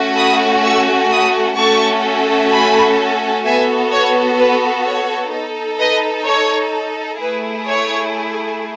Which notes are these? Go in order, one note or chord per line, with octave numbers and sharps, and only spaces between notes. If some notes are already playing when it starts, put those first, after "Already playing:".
Already playing: A3 C#4 F#4
B5 D#6
C#6 E6
B5 D#6
A3 C#4 F#4 A4 A5 C#6
G#5 B5
B3 F#4 A4 E5 G#5
C#5
B4
C#5
D#4 A4
B4 D#5
C#5
A3 E4 G#4 B4
C#5